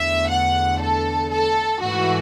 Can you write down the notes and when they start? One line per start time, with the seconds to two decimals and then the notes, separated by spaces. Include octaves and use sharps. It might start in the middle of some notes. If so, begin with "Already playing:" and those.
Already playing: E2 D3 A3 E5
0.30 F#5
0.81 A4
1.31 A4
1.82 G#2 E3 A3 F#4